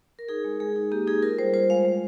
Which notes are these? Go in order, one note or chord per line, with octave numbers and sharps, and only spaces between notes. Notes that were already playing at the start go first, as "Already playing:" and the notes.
A#4
D#4 G#4
G#3
G#3 G#4
D#4
A#3 G4
D#4 G#4
F4 A#4
G3 C5
F4 C5
G#3 F5
G#3